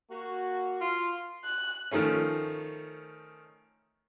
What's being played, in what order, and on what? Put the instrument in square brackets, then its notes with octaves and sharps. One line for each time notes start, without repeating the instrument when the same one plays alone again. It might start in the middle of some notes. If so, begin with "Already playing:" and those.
[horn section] A#3 F#4
[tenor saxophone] F4
[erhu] F#6
[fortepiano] D#3 F3 A3 C#4